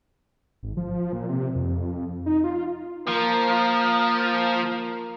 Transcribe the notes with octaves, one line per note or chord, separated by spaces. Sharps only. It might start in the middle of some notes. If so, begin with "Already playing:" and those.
G#1
F3
A#2
C3
F2
D#4
F4
F3 A#3